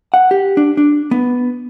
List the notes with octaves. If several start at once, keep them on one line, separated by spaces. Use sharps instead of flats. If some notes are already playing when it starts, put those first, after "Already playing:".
F#5
G4
D4
D4
B3